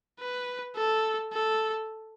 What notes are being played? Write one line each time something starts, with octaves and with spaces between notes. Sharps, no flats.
B4
A4
A4